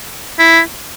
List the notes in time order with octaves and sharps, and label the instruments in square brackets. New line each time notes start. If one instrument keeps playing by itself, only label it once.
[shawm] E4